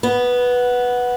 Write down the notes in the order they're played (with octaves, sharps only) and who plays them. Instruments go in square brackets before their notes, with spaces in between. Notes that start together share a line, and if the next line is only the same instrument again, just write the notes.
[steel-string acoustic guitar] B3